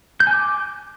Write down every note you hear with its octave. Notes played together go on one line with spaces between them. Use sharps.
G6
G#5
D6